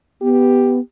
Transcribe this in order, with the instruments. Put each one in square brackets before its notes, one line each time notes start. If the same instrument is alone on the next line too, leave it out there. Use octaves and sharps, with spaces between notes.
[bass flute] B3 [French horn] G4